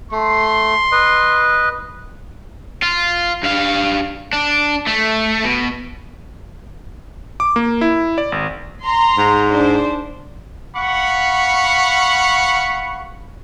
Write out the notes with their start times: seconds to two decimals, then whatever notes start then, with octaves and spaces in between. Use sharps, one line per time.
0.11 A3 C6
0.92 B4 D#5
2.83 F4
3.43 G2 F5
4.33 D4
4.87 A3
5.44 B2
7.40 D6
7.56 A#3
7.81 E4
8.18 D5
8.32 G#1
8.84 A#5 C6
9.17 G#2
9.51 D4 C5
10.75 F5 F#5 B5 C#6